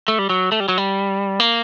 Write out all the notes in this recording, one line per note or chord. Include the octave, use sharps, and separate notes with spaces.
A3
G3
F#3
A3
G3
F#3
G3
A#3